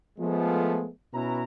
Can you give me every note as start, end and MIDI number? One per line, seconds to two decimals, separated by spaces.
0.19 0.88 53
0.19 0.88 56
0.19 0.88 57
0.19 0.88 59
1.14 1.43 47
1.14 1.43 61
1.14 1.43 64
1.14 1.43 71
1.14 1.43 82